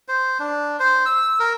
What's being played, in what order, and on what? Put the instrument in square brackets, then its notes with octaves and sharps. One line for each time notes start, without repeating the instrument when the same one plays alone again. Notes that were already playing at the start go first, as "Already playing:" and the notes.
[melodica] C5
D4
C5
E6
A#4